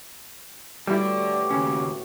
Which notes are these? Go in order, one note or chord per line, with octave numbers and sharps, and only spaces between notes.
A2 G3 B3 E4 F#4 G4 A4 D5
D#2 C#3 C#4